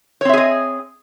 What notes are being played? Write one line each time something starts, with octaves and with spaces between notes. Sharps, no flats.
C4 G#4 C#5 D#5 E5